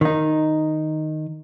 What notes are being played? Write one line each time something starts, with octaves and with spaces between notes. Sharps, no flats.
D#3 D#4